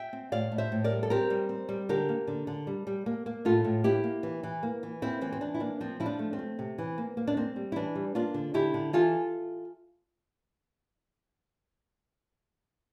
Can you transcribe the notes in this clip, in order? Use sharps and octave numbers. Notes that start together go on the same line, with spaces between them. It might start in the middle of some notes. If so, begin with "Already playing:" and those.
Already playing: E5 G5
C4
A2 D5 F5
A2
C5 E5
A2
A#4 D5
G3
A4
C4 G4 A#4
G3
C4
G3
D3 G4 A#4
A#3
D3
D3
G3
G3
A#3
A#3
A2 F4 A4
A2
A#3 E4 G4
A#3
E3
E3
A#3
E3
A#3 C4 E4
E3 C4
C4
E3 D4
E4
A#3 D4
F3 C4
F3 E4
D4
A3
C4
A3
C3
E3
A#3
A#3
D4
A#3 C4
G3
E4
E3 D4
G3
A#3 D4 F4
D3
D3 E4 G4
D3
E3 F4 A4